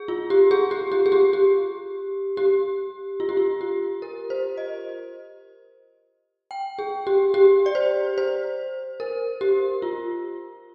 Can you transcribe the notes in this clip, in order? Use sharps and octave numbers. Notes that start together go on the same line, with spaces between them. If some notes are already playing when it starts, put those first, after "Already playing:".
Already playing: G#4
F4
G4
G#4
G4
G4
G#4
G4
G4
G4
F4
G4
F4
G4
A#4
C5
D#5
G5
G#4
G4
G4
D5
C5
C5
A#4
G4
F4